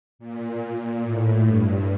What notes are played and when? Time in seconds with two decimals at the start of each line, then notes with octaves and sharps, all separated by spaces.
0.19 A#2
1.03 A2
1.45 G2